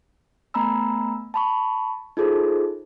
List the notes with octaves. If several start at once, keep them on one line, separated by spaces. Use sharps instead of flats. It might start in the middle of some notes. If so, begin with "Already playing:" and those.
A3 B3 G#5 A#5 B5 E6
A5 B5 C#6
D#4 F4 G#4 A4 C5